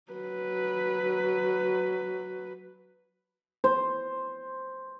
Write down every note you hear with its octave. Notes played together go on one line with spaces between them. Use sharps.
F#3 B4
C5